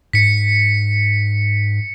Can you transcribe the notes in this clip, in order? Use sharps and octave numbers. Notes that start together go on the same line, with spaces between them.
G#2 B6 C#7